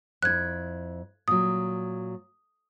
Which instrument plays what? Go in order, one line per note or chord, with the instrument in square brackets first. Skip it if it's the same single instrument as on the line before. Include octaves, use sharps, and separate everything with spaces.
[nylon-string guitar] F2 E4 [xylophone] F#6 G#6
[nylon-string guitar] A#2 F#3 [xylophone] D#6